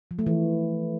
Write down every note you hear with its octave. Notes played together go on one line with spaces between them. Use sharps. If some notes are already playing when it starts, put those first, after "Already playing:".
F3
A3
E3